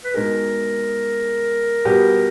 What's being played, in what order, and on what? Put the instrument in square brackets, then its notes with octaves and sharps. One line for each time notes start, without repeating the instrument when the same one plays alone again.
[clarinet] B4
[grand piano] B2 G#3 D#4 G#4 [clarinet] A#4
[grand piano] B2 G3 B3 G4